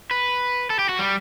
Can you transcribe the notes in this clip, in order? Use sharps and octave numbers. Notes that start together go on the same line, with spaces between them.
B4
A4
G4
F#4
G3